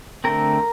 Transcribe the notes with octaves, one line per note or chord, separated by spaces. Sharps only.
D3 A3 C4 A#4